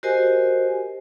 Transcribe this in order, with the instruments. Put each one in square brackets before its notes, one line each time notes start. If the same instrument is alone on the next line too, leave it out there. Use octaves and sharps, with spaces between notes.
[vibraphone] F#4 G4 A#4 C5 D#5 G#5